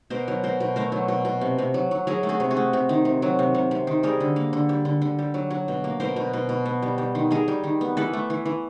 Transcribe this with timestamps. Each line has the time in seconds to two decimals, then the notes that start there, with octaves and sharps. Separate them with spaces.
0.10 B2 A#4 C5
0.28 F#3
0.43 B2 A#4 C5
0.60 B2
0.76 A3 A#4 C5
0.92 F#3
1.08 B2
1.25 B2
1.41 C3
1.58 C3
1.74 F#3
1.91 F#3
2.07 F#3 G#4 A#4
2.23 A3
2.29 F#4 G#4
2.40 C3
2.50 F#4 G#4
2.57 A3
2.73 C3
2.89 D#3
3.05 C3
3.22 F#3
3.39 C3
3.55 C3
3.71 C3
3.87 D#3
4.03 G3 G#4 A#4
4.20 D3
4.36 A#3
4.53 D3
4.69 G3
4.85 D3
5.02 D3
5.19 G3
5.34 F#3
5.50 F#3
5.68 B2
5.84 A#3
6.00 B2 A#4 C5
6.16 B2
6.33 B2
6.49 B2
6.66 B3
6.83 G3
6.98 G3
7.15 D#3
7.31 D#3 G#4 A#4
7.48 G3
7.64 D#3
7.81 B3
7.97 E3 A4 B4
8.13 A3
8.30 E3
8.45 E3